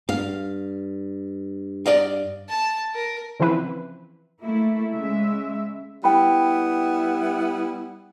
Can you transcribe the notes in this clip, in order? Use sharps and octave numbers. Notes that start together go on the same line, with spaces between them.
G2 F5
D5 D#5 F5
A5
A#4
C#3 E3 F3 C4 E4 B4
A3 A#3 E4
C#3 G#3 E5
G3 B3 E4 G5 B5